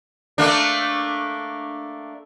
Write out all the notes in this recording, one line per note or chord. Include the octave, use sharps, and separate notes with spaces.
A3 A#3 D4